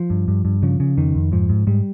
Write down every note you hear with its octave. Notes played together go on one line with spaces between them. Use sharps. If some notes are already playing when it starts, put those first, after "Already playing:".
Already playing: F3
G2
G2
G2
C#3 F3
C#3
F2 D#3
F2
G#2 F3
G#2
G#2 G3